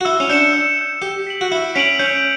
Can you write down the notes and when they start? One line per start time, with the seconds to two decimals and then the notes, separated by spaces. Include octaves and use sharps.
0.01 F#4
0.05 E4 E6
0.20 C#4
0.29 D4 G6 C#7 E7
0.54 E6
0.78 G6 C#7 E7
1.02 G4 E6
1.27 B6 D7 F#7
1.41 F#4
1.51 E4 E6
1.75 C#4 B6 D7 F#7
1.99 C#4 G6